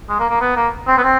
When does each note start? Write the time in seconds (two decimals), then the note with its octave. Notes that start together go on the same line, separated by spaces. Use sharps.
0.09 G#3
0.19 A#3
0.30 A#3
0.41 B3
0.56 A#3
0.88 C4
0.98 B3
1.03 C4